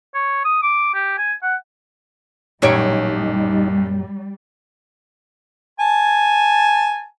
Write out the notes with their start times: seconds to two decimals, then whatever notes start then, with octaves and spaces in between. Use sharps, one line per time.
0.14 C#5
0.45 D#6
0.63 D6
0.94 G4
1.18 G#5
1.42 F#5
2.62 A1 F#2 A#2 G3 D#4 G4 C#5 D7
5.80 G#5 A5